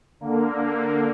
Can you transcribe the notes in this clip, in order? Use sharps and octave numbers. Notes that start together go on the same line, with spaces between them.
D3 A#3